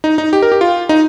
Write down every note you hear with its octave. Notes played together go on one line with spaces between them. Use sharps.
D#4
D#4
G4
A#4
G4
F4
D#4